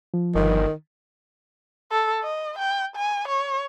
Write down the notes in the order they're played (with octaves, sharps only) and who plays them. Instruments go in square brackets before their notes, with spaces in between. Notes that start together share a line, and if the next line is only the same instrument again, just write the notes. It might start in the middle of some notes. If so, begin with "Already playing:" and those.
[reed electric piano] F3
[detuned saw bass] G1 [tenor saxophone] D#3
[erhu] A4
D#5
G5
G#5
C#5